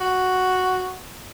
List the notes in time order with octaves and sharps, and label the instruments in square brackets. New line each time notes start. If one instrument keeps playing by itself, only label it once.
[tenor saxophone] F#4